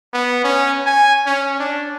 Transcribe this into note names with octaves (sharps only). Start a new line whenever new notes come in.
B3
C#4
G#5
C#4
D4